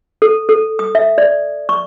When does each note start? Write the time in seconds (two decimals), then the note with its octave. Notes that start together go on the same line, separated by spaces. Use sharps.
0.22 A4
0.49 A4
0.79 D#6
0.95 E5
1.18 D5
1.69 C#6